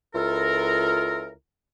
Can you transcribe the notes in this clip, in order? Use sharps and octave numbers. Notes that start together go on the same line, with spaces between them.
C#2 E4 F4 A4 A#4